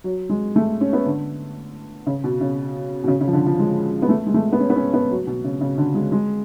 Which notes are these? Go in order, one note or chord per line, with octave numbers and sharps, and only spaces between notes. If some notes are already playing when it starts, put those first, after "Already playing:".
F#3
G#3
A3
C#4
B3
D3
C#3
B2
C#3
B2
C#3
C#3
F3
D3
F3
G#3
B3
A3
G#3
A3
B3
C#4
B3
C#4
B3
F#3
B2
C#3
C#3
D3
G#3
G#3